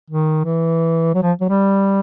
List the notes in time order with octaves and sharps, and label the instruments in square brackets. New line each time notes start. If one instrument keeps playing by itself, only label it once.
[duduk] D#3
E3
F#3
F3
F#3
G3